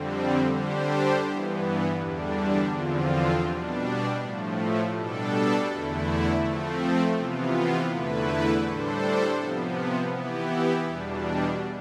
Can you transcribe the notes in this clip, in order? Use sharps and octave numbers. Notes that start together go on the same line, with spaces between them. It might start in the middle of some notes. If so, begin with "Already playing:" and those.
Already playing: F2 D3 G3 C4
D3 G3 D4 G4 C5
G2 E3 B3
E2 D3 G3 D4
E2 D3 F3 C4 F4
B2 G3 D4
A2 F3 A3
B2 G3 D4 A4
E2 D3 A3 E4
F3 A3 C4
C3 E3 B3 F4
E2 D3 A3 E4 B4
A2 G3 D4 A4 C5
C3 F3 B3
E3 B3 E4 G4
E2 B2 G3 D4